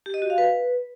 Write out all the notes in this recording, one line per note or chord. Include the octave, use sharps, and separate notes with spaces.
G4
D#5
F#4
F5
B4